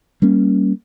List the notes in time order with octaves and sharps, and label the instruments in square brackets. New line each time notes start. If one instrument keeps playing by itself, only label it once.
[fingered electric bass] G3 A#3 C#4